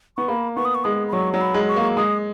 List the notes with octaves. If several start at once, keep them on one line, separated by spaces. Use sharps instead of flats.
B3 C#6
A#3 B5
B3 C#6
D#6
C#6
G#3 D#6
B5
F#3 C#6
F#3 A#5
B5
G#3
C#6
A#3
G#3 D#6